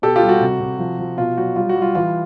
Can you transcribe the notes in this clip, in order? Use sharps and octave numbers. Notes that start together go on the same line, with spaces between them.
B2 G4 A4
F4 G4
G3
F#4
C3
C3
F3
F3
B2 F4
F#3 F#4
G3 F4
F#4
G3
F4
E3 F4